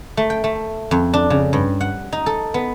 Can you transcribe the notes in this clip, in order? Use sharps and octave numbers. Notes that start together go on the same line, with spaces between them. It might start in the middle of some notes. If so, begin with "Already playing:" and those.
A3
G5
A3
F2
D4
C#3
G2
F#5
D#4
A4
B3